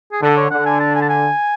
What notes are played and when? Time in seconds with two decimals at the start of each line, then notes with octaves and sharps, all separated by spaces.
0.12 G#4
0.22 D3 A4
0.37 C#5
0.51 D3 F#5
0.66 G#5
0.80 A5
0.95 G#5
1.01 A5
1.10 G#5